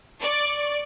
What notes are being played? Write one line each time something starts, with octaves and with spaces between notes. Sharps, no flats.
D5 C#6